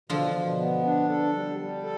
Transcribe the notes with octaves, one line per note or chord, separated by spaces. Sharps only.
B2 D3 F3
B2
B3
D4
A4
G3
G3
A4